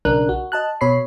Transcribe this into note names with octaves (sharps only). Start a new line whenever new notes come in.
B1 C#3 D4 A#4 F#6
F#4
D#5 A5 F#6
B2 C#5 B5 C7